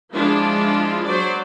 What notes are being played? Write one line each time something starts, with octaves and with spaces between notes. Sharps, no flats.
F3 G#3 D4 E4 F4
F#3 C5 D5